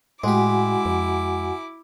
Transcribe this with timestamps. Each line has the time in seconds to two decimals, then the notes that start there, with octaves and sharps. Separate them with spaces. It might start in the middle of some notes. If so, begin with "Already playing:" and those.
0.24 A2 G#3 E4 F#4 G4 F#5 G#5 D6
0.85 F2